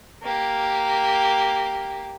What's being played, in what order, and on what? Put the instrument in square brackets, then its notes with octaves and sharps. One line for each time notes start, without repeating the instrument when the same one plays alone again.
[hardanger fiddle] A#3 G4